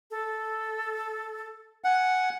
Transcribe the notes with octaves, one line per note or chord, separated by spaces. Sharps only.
A4
F#5 G#5